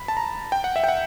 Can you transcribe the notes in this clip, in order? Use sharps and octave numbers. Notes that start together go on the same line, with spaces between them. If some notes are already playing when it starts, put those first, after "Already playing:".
Already playing: B5
A5
A#5
G5
F#5
E5
G5
F#5